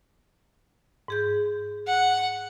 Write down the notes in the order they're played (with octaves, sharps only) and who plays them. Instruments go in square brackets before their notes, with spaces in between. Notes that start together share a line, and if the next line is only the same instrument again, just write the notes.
[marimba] G#2 G#4 G6
[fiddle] F#5